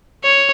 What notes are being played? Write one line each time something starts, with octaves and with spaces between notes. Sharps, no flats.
C#5